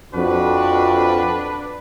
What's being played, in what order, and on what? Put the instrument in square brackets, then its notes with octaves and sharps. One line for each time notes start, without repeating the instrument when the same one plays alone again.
[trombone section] F2 [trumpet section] D4 B4 [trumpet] F#4